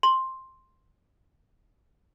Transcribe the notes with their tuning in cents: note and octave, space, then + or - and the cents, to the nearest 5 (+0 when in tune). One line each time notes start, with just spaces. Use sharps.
C6 +5